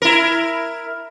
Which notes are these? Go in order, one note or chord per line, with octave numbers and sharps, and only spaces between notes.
E4 A#4